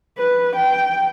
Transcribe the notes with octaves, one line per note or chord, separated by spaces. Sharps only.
B4
G5